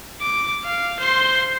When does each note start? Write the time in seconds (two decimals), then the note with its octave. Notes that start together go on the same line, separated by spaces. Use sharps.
0.21 D6
0.65 F5
1.00 C5 C6